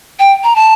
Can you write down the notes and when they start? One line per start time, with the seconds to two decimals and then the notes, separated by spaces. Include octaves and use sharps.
0.19 G5
0.44 A#5
0.56 A5